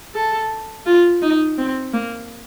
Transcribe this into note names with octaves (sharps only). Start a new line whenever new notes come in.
A4
F4
D#4
C4
A#3